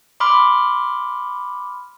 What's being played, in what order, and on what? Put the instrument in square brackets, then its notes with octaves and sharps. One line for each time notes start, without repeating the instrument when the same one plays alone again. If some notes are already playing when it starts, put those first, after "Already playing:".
[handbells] B5 C6 D6 F6